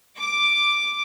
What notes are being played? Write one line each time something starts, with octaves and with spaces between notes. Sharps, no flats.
D6